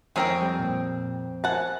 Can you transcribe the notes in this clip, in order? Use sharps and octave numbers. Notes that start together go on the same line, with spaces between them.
F2 C4 A#4 C#5 G5 G#5
G3
A#2
A#4 C5 F#5 G#5 A5